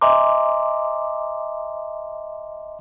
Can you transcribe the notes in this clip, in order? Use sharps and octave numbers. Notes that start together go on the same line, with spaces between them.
D#5 E5 G#5 A#5 C6 D6